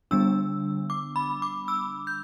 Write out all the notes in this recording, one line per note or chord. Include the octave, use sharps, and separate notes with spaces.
D3 G3 B3 D4 E6
D6
B5
D6
E6
G6